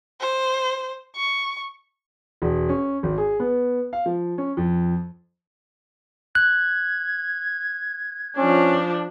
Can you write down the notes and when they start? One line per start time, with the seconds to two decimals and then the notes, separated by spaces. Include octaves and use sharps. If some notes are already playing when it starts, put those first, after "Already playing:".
0.21 C5
1.16 C#6
2.42 E1
2.69 C#4
3.03 G#1
3.18 G#4
3.40 B3
3.93 F5
4.06 F3
4.38 C#4
4.57 F2
6.35 F#6 G#6
8.37 F3 C#4 D4